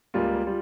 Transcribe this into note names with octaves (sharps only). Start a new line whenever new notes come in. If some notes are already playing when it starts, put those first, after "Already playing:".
C#2 C#3 G3 A#3 F4
G3 F4